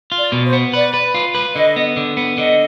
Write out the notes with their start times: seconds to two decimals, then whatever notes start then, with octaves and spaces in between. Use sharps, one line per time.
0.12 F4
0.18 D5
0.32 B2
0.46 C5
0.53 B3
0.73 B4 D5
0.94 B4
1.15 F4
1.35 B4
1.55 D3 D#5
1.76 B3
1.97 D3
2.17 B3
2.38 D3 D#5